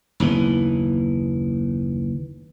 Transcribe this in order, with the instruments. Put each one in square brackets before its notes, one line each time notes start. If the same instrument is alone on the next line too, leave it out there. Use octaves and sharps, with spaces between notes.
[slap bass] F#1 D#2 E3 B3